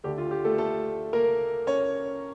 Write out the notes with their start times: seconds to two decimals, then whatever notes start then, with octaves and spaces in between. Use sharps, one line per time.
0.04 D2 D3 A3 G4
0.18 F4
0.31 G4
0.45 A3 A4
0.58 A3 A4
1.13 A#3 A#4
1.67 C#4 C#5